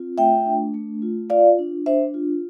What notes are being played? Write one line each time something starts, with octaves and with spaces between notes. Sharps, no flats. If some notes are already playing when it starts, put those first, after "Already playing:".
Already playing: C4 F4
A3 E5 G5
D4
A3
F4
F4 D5 F5
D4
D4 C5 E5
F4